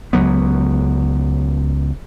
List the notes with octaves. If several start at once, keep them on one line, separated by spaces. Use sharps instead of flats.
C#2 F#3 B3